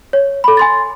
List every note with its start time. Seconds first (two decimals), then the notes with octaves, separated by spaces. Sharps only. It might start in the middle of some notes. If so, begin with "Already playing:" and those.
0.13 C#5
0.44 A4 B5
0.57 G#5 C6 A6